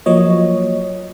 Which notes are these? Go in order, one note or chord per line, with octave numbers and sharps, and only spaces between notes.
F3 F#3 A#3 C#5 D#5